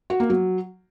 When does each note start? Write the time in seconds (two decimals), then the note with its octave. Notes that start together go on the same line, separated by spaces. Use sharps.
0.10 F#4
0.20 A#3
0.30 F#3